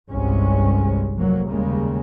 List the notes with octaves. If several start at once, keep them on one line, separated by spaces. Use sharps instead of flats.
G1 C2 G2 C3 G#3 C#4
F1 F#3 A#3
D#2 C#3 G3 G#3 A#3